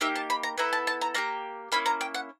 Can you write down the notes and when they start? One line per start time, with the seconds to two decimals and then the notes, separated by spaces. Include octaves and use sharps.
0.01 A#3 D#4 G4 E5
0.16 A5
0.30 B5
0.43 A#5
0.58 B3 E4 A4 A#5
0.73 A5
0.87 A5
1.01 A#5
1.15 A#3 D4 G4 A#5
1.72 A#3 C#4 E4 B5
1.86 A#5
2.01 G5
2.14 F#5